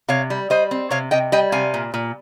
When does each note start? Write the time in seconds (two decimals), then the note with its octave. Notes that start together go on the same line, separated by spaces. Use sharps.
0.08 C3 C#5 F5
0.30 G3
0.50 G3 C5 D#5
0.71 C4
0.90 C3 C#5 F5
1.11 C3 D#5 G5
1.32 G3 D#5 G5
1.52 C3 F5 G#5
1.74 A#2
1.94 A#2